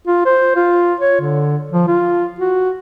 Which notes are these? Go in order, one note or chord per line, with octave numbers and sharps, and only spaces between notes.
F4
C5
F4
C#5
D3
F3
F4
F#4